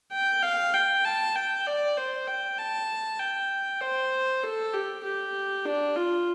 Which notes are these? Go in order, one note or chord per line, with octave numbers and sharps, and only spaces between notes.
G5
F5
G5
A5
G5
D5
C5
G5
A5
G5
C5
A4
G4
G4
D4
F4